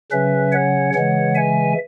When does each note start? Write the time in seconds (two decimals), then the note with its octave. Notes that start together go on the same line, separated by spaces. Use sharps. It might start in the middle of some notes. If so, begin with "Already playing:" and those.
0.11 C#3 F#3 C#4 B4 E5
0.52 C#5 F#5
0.94 C#3 E3 G#3 C#5 F#5
1.35 E5 G#5